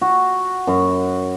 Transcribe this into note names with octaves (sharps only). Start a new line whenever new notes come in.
F#4
F#2